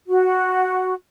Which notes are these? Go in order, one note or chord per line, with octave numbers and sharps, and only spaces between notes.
F#4